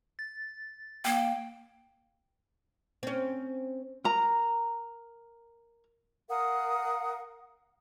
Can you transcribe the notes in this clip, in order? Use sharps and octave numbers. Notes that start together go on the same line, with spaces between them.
A6
A#3 G5
C4 C#4
A#4 A#5
A#4 F5 F#5 D#6